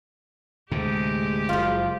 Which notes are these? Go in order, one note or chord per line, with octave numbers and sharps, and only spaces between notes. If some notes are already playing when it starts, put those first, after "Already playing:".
D2 A2 C3 G#3 G4
F#1 F3 F4